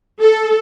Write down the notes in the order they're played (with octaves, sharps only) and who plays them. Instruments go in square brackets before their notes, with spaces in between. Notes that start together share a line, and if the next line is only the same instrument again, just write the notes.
[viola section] A4